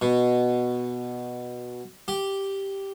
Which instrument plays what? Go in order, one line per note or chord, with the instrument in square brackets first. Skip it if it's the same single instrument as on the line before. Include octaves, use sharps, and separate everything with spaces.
[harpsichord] B2
G4